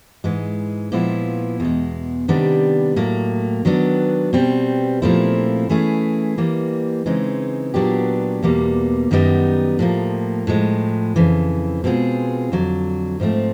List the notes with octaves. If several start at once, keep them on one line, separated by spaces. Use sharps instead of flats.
G#2 E3 G#3
A#2 F3 G#3 B3 E4
E2 B2 G#3
C3 D#3 G3 B3 D4
A2 F#3 A#3
D#3 F#3 B3 D4
B2 G3 C4
A#2 F3 A3 C4 E4
E3 A3 C#4 E4 G#4
E3 G3 A#3
C#3 E3 G#3 C4 D#4
A#2 F#3 B3 D4 G4
E2 B2 G3 A#3
F#2 D#3 G3 B3 D#4
A2 F3 A#3
A2 F3 G#3
F2 C#3 E3
B2 G#3 C4 F4 G#4
F2 D3 F#3
G#2 F3 A3 C4